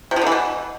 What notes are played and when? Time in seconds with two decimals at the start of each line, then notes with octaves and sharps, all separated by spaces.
0.11 C3
0.16 F3
0.21 D3
0.27 E3
0.32 B2